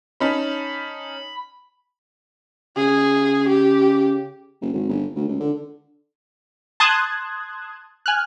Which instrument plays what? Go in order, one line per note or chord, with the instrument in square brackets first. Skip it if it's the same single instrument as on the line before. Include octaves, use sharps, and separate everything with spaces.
[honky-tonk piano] C#4 D#4 A5 [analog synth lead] B5
[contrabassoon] C#3 [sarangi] G#4
[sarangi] G4
[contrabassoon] F#1
G#1
G1
D2
C#2
D3
[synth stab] A5 C6 D#6 F#6 G#6
G#5 F6 F#6